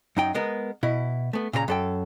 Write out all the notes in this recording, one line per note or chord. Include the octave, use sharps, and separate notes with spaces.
F#2 D#4 G5
G#3 B3 A#4
B2 E4
A3 B3
A#2 C#3 C5 A#5
F#2 A4 G5